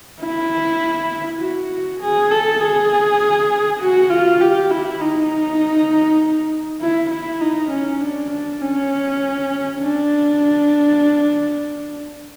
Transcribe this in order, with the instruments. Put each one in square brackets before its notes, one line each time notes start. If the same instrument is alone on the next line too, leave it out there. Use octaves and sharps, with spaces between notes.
[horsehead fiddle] E4
F#4
G#4
A4
G#4
F#4
F4
G4
E4
D#4
E4
E4
D#4
C#4
D4
D4
C#4
D4